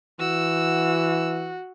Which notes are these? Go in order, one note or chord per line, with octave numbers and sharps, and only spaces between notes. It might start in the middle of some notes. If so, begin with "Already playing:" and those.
E3 F#4 E6